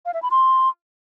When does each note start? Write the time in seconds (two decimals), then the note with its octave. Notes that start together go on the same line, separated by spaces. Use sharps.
0.06 F5
0.14 E5
0.22 B5
0.31 C6